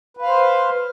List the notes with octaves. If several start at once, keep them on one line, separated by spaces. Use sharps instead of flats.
B4 C5 F5